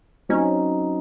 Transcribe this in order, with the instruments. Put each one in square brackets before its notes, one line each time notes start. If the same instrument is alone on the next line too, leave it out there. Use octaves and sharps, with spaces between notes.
[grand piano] F#3 C4 D#4 [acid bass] C#4